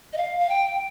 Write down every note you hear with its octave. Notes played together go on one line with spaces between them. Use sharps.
D#5
F5
F5
G5